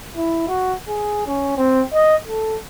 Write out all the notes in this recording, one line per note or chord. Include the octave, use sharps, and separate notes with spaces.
E4
F#4
G#4
C#4
C4
D#5
A4